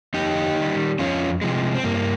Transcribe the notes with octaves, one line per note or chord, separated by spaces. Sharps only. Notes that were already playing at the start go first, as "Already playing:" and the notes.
F2 D#4 G4
D#3 G3
F2 C#4 F4
C3 F3 G#3
C4
G2 A#3